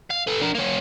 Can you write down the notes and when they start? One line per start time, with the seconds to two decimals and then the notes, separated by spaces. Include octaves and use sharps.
0.10 F5
0.27 A4 B4
0.42 D4 A#4
0.55 A#3 C#4